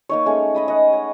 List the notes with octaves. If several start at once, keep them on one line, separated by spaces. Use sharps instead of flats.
A#3 D#4 C#5
G#3 A3 C#4
D#5 B5 D#6
D#5 F#5
C#5